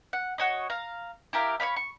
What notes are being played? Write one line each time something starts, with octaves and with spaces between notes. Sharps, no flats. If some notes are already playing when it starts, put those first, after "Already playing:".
F#5
F#4 C#5 D#5
F5 A#5
E4 G4 A#4 F5
C#5 D5 F5 B5
C#6